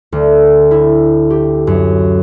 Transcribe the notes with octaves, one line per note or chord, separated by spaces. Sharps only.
D2
E4
G4
F#2